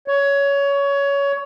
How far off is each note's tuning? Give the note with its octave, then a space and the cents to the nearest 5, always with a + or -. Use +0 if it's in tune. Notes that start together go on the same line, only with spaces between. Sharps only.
C#5 +20